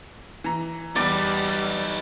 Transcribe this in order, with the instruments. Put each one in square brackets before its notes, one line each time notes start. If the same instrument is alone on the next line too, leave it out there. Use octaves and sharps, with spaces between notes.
[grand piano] E3 A#5
[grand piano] E2 [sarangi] G3 [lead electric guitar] D#4 B4 [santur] D5